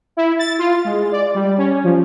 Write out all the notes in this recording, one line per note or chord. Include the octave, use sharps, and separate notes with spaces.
E4
A6
F4
G#3
D5
G3
C#4
F3